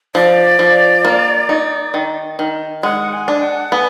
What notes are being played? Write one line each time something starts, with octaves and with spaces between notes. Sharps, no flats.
F3 D5
F3
A#3
D#4
D#3
D#3
G#3 F#5
G#5
D4
F#5
B3 G#5